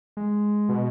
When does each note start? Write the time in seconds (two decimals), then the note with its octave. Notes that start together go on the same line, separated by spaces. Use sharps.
0.17 G#3
0.69 B2